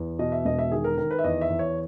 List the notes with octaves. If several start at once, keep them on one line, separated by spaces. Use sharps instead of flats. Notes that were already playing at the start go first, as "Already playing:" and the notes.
Already playing: E2
B2 D#5
E5
E1 D#5
E5
D#3 G#4
A#4
D#3 A#4
B4
E5
E2 D#5
E5
E2
C#5